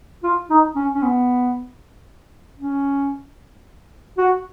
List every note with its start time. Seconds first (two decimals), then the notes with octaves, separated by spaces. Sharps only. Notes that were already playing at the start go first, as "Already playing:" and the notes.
0.23 F4
0.50 D#4
0.75 C#4
0.94 C#4
1.02 B3
2.59 C#4
4.18 F#4